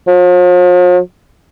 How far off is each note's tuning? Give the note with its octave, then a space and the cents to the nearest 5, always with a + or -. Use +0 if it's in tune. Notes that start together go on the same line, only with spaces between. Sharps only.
F3 +45